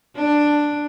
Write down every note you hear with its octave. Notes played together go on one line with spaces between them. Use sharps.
D4